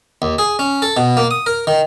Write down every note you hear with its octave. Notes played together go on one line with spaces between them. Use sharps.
D#2
G#4
C#4
A4
B2
A#3
D#6
A#4
D#3